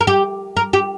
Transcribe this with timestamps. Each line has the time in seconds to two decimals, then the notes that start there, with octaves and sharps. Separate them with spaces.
0.01 A#4
0.07 G4
0.57 A#4
0.73 G4